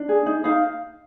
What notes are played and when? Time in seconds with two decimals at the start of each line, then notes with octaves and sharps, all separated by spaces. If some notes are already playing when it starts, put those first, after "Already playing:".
Already playing: D4
0.09 G#4
0.26 D#4
0.44 D#4 F5